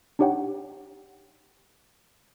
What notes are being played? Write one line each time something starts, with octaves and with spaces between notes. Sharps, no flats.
D4 D#4 G4 C#5 F#5 G5